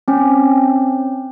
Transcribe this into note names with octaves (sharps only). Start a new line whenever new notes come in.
C4 C#4